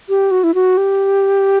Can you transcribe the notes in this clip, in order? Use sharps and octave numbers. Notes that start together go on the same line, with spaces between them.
G4
F#4
E4
F#4
G4